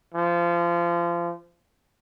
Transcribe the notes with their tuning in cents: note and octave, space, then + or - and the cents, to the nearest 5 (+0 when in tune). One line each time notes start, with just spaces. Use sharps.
F3 -25